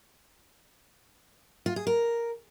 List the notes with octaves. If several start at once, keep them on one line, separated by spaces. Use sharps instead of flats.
F4
G#4
A#4